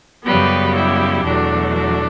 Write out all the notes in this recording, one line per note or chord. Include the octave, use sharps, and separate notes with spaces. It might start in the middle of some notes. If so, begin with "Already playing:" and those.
F#2 C#3 G3 B3 G4 B4
E4 G4
E2 B2 F#3 A3 D4
D4